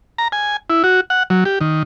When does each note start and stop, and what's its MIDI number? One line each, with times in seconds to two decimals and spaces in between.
0.18 0.28 82
0.32 0.57 80
0.70 0.83 64
0.84 1.01 66
1.10 1.23 78
1.30 1.44 54
1.45 1.59 67
1.61 1.83 51